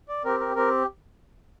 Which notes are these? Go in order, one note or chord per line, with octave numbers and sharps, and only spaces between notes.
D5
C4 G4 A#4
A#4
C4 G4 A#4